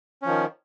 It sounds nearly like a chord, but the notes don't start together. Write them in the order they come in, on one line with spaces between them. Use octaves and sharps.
C#4 F3 D#3